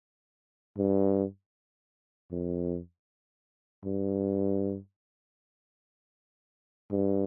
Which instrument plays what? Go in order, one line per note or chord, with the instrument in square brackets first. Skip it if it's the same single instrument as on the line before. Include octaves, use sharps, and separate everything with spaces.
[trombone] G2
F2
G2
G2